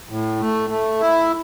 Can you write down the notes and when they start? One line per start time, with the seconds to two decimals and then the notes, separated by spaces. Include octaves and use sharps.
0.09 A2
0.40 A3
0.70 A3
1.01 E4